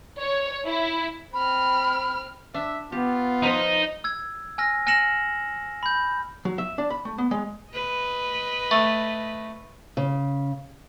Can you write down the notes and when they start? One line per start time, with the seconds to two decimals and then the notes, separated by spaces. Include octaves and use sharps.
0.21 C#5
0.66 E4
1.33 C4 B5 F6
2.54 D4 E5
2.92 B3 F4 G4
3.43 F3 D#4 B4 C5 D#5
4.04 E6 G#6
4.58 G#5 E6 F6 A#6
4.87 G#5 F6 A#6 C#7 E7 F#7
5.83 B5 G6
6.45 F#3
6.58 E5
6.78 D4
6.90 B5
7.05 A3
7.18 B3
7.31 G#3
7.72 B4 D#5
8.71 A3
9.97 C#3